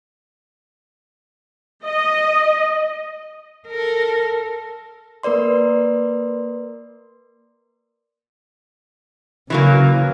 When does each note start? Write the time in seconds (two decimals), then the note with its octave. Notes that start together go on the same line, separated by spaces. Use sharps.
1.85 D#5
3.67 A4 A#4
5.23 A#3 A#4 B4 D5 C6
9.50 C#3 E3 F#3 A#3